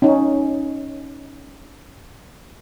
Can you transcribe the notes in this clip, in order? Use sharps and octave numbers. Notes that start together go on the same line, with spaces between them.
C#4 D#4